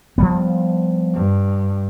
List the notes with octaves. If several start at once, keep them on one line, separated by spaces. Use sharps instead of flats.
F3 G3 B3
G2